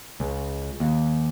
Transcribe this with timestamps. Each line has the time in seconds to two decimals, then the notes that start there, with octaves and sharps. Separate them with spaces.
0.20 C#2
0.80 D#2